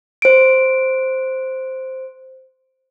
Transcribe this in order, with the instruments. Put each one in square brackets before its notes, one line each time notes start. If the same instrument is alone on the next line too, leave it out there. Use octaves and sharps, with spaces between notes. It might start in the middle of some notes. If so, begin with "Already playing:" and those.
[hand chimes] C5 D7